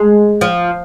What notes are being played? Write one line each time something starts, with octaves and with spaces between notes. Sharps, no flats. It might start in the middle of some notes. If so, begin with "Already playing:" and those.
Already playing: G#3
F3